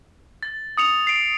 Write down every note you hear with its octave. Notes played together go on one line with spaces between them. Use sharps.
A6
D#6 C#7 F7
C7 D7